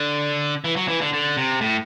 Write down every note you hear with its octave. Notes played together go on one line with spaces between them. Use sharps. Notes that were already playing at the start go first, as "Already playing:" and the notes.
Already playing: D3
E3
F#3
E3
D3
D3
C3
A2